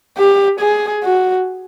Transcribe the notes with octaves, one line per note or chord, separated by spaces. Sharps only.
G4
G#4
F#4